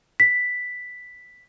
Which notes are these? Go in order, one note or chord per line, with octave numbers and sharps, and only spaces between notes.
B6